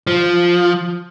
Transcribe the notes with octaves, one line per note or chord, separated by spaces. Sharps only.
F3